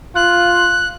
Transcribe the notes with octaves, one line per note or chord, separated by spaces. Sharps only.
F4 F#6